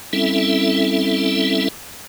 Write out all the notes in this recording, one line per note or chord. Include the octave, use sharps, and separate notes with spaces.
G3 C4 C#4 E4 A4 E5